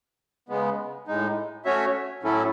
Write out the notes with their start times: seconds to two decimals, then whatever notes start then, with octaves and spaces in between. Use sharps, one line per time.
0.49 C#3 G#3 B3
1.07 A2 G#3 D#4
1.65 A3 C#4 F#4 C#5 E5
2.23 A2 F#3 C#4 E4 A4